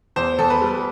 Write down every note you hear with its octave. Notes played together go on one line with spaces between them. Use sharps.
E2 C5
E2 A4
B4
G3